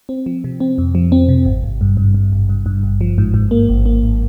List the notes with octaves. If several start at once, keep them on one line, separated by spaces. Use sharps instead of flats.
C4
F3
C3
C4
F2
F3
C4
C3
G#1
G#1
G2
G2
G2
G#1
G2
G2
G#1
F3
G#2
G#2
A#3
G#1
A#3
G#1